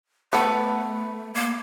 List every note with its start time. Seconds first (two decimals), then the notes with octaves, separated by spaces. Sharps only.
0.33 A3 B3 A4 B4
1.34 A#3